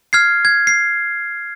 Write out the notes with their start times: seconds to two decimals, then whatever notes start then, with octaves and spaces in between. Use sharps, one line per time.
0.13 F6 G#6 C7
0.45 G#6
0.67 C7